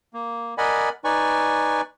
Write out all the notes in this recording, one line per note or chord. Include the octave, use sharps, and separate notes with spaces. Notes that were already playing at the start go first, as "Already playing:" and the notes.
A#3
A#4 D5 D#5 F#5 G#5 B5
D#4 B4 D5 G#5 C#6